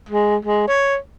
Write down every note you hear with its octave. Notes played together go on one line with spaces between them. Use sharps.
G#3
G#3
C#5